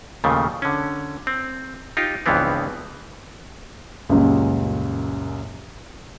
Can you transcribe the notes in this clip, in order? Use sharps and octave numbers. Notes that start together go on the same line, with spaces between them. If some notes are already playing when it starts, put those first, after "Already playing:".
D#2 A#2 C#3 F3 A3
D3 C#4
C4
D#4 F4 G4
C#2 G2 E3 F3 B3 C4
C#2 F#2 A#2 G3